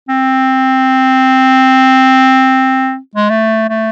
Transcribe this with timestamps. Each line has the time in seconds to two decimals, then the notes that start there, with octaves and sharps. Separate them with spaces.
0.09 C4
3.15 G#3
3.30 A3
3.69 A3